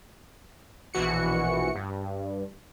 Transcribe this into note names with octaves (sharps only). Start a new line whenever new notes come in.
A#1 B2 E3 F#4 C#7
G2